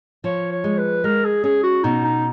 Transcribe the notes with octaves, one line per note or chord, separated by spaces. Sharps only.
F3 C#5
C#5
G#3
B4
G#3 A#4
G#4
C#4 G#4
F#4
B2 D#4
D#4